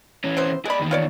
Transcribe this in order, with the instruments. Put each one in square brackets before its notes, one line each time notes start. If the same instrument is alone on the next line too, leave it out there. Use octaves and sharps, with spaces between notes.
[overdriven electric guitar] E3 C#4
[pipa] C3 B3 C5
[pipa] G#3 B5 [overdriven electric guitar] G#4 D5
[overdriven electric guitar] E2 D#3
[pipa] F4 C#5 D5